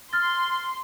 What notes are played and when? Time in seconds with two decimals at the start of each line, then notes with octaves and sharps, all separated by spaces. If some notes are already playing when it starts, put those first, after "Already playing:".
0.13 C6 F6 A6